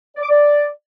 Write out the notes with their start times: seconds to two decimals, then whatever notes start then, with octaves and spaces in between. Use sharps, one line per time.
0.16 D5
0.23 D6
0.29 D5